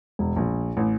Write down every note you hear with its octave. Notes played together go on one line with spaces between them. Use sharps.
E1
A#1
A1